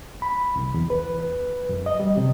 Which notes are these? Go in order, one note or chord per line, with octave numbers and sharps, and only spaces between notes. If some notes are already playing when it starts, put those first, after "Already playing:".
B5
C2
E2
B4
F#2
D#5
G3
C3